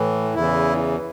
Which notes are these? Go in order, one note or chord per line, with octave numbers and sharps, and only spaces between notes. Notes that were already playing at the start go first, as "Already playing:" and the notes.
Already playing: A2 E3
E2 C#3 E3 E4